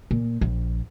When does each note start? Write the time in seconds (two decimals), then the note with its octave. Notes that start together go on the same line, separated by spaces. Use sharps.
0.11 A#2
0.41 A#1